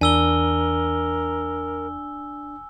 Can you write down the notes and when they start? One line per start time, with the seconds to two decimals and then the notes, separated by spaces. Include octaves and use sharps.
0.01 E2 D4 A#4 G#5 E6 G7